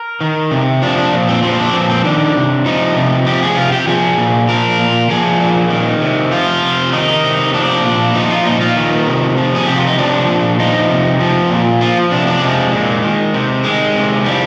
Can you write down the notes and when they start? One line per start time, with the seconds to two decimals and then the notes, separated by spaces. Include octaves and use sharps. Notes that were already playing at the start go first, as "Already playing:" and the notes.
Already playing: A#4
0.21 D#3
0.51 C3
0.82 F3 D4
0.98 D4
1.13 A#2
1.28 C4
1.43 F3 C4
1.59 D4
1.74 A#2 C4
1.90 C4
2.05 D#3 D4
2.35 C3
2.66 F3 D#4
2.96 C3
3.26 F3 G4
3.42 G#4
3.57 C3 F4
3.72 G4
3.87 F3 G#4
4.18 A#2
4.49 F3 A#4
4.79 A#2
5.10 F3 G#4
5.40 A#2
5.70 D#3
6.02 C3
6.32 F3 F4
6.62 C3
6.93 D#3 D#4
7.23 C3
7.54 F3 D4
7.84 A#2
8.15 F3 D#4
8.31 F4
8.45 A#2 D#4
8.61 F4
8.77 D#3
9.07 C3
9.37 F3
9.55 G#4
9.66 C3 G4
9.76 F4
9.87 D#4
9.98 F3 D4
10.28 A#2
10.59 F3 D#4
10.90 C3
11.20 F3
11.50 A#2
11.81 F3 F4
12.11 C3 D4
12.27 D4
12.42 F3 G#3
12.73 A#2
13.03 D#3
13.34 C3
13.64 D#3 G#3
13.95 C3
14.25 F3 G3